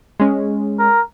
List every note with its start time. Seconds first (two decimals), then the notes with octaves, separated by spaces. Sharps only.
0.20 G#3 C#4
0.79 A#4